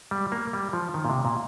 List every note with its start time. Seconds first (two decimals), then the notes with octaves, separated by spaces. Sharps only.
0.11 G3
0.32 A#3
0.53 G3
0.73 F3
0.94 D#3
1.05 A#2
1.10 C3
1.25 A#2